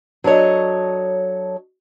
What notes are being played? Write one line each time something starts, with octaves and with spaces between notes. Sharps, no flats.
F#3 D4 A4 C#5 D#5